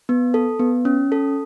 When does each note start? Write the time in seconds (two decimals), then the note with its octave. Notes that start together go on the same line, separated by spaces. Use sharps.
0.09 B3
0.34 A4
0.59 B3
0.85 C#4
1.12 A4